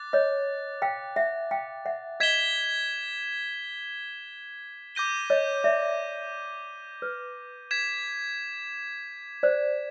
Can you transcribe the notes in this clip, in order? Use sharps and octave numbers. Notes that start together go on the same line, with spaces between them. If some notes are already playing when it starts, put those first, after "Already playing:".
Already playing: D6 F#6 A6
C#5 D#5
F5 G5
E5 F#5
F5 G5
E5 F#5
D#5 F5 G#6 B6 E7 G7
D6 G6 A#6 D#7 G7
C#5 D#5
D5 E5
B4
G#6 B6 E7
C5 D5